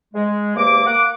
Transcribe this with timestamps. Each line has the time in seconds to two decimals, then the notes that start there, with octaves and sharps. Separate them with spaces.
0.14 G#3
0.56 E2 C3 A#3 D6
0.85 A#3 F#5 D6